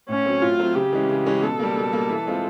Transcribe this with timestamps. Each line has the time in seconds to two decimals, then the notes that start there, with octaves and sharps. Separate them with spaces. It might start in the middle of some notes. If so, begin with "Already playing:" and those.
0.09 A2 C#4
0.26 F#3 A3 C4
0.42 A2 F4
0.59 F#3 A3 C4
0.76 C#3 G4
0.93 E3 G#3 C#4
1.10 C#3
1.26 E3 G#3 C#4
1.42 B2 A4
1.59 G3 A#3
1.76 B2
1.93 G3 A#3
2.09 E3
2.26 G#3 C4 F4